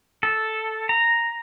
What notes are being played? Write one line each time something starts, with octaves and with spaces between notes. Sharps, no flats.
A4
A#5